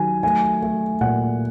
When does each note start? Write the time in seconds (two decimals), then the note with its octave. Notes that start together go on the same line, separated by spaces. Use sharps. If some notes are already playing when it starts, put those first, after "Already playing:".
Already playing: D#3 F#3 G#5
0.23 A3 G#5
0.62 A3
1.01 A#2 F#5